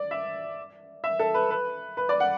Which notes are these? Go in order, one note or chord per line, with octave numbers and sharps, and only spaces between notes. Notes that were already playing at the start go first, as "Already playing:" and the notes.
Already playing: D5
E5
E5
A4
B4
B4
B4
D5
F#5